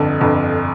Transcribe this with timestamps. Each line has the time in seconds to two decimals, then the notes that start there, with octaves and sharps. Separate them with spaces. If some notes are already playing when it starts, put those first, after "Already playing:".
Already playing: G1 F2 D3
0.20 G1 F2 D3